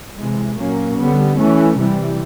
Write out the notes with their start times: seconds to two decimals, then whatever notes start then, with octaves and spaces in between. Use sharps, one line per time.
0.17 C3 E3 G#3
0.57 A#2 F#3 A#3 C#4
0.97 D3 G3 B3
1.38 E3 A3 C#4
1.78 C3 E3 G3